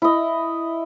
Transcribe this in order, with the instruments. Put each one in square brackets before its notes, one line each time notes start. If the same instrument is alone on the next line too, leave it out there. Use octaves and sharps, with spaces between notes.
[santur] E4 D#5